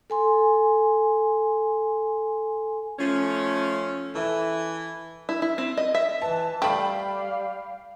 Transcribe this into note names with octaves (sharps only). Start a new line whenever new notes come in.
A4 G#5 C6
F3 A3 C#4
E3 A4 E5
E4
E4
C4
D#5
E5
E3 B4 A5
G3 A3 F5 G5 B5